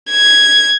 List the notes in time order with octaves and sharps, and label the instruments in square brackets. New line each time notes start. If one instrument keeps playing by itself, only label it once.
[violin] G#6